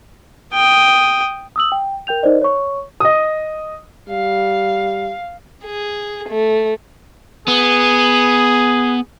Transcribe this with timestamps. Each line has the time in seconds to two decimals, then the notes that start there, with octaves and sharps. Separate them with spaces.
0.54 G5 D#6
1.56 D#6 E6 F#7
1.72 G5
2.07 A#4 G5 G6 F7
2.23 D#4 A#4 C5 D5 D#5
2.42 C#5 C#6
3.00 D#5 D#6
4.09 G3 F5
5.64 G#4
6.29 A3
7.48 B3 G#4